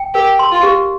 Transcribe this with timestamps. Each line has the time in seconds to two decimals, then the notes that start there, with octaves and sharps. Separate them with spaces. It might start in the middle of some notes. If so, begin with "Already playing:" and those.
Already playing: G5
0.14 G4 A#4
0.39 C6
0.51 F4
0.63 G4